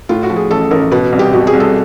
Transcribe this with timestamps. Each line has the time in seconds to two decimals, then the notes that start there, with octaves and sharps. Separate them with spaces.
0.09 A2 F4
0.23 F#4
0.30 F3
0.36 G#4
0.50 A1 A4
0.71 A1 A#4
0.91 B2 B4
1.12 C2
1.19 G4
1.33 B2 F#4
1.47 G#4
1.53 C2
1.60 A4